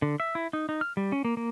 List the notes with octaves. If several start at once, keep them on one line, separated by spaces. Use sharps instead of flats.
D3
E5
E4
D#4
D#4
F6
G3
C#4
A#3
A#3